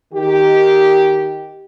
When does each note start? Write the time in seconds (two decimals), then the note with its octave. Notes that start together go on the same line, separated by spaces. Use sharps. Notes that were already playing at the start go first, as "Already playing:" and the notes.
0.13 D#3 G4